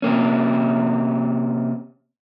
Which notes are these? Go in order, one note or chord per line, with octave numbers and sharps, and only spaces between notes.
C3 A#3 C#4